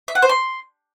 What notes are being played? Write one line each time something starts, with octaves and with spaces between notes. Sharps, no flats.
E5
F#5
C5
C6